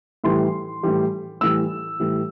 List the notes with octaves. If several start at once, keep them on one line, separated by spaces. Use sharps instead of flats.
A2 E3 G3 C6
A2 E3 G3
A2 E3 G3 E6
A2 E3 G3